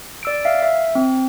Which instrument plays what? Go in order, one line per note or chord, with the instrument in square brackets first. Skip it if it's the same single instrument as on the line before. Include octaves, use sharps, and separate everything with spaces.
[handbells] D5 E6 D7
E5 F5
E5
C4